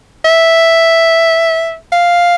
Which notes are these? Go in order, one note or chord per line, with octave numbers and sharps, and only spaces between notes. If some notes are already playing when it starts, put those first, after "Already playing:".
E5
F5